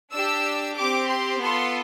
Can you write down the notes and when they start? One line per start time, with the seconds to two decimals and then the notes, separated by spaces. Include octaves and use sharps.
0.12 D4 G4 E6
0.77 C4 G4 D6
1.10 C6
1.41 B3 F4 A4 C6